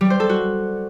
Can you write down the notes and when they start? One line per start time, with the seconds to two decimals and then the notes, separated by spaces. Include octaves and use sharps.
0.01 G3
0.10 C5
0.20 A4
0.29 F#4